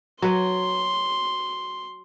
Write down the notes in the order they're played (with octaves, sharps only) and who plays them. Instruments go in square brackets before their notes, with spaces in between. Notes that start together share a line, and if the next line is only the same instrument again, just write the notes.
[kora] F#3 B4 [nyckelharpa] C6